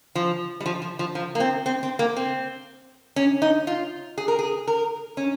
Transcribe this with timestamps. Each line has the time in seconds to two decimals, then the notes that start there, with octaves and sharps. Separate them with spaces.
0.15 F3
0.60 G3
0.66 F3
0.82 F3
0.99 F3
1.15 F3
1.35 A#3
1.40 C4
1.66 C4
1.83 C4
1.99 A#3
2.17 C4
3.16 C#4
3.42 D#4
3.67 F4
4.18 G#4
4.28 A#4
4.39 G#4
4.67 A#4
5.17 C#4